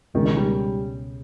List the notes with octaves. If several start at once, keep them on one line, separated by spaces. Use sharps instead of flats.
C#2 B2 D#3 G#3 C#4 G#4
D#3
G3